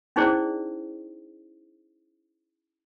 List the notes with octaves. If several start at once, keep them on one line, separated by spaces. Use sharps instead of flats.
C#4 D#4 E4 G#4 C5 D5